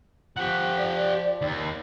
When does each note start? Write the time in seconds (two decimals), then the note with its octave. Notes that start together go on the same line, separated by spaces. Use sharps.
0.37 F3 G4 F#5
0.78 D5
1.42 D#2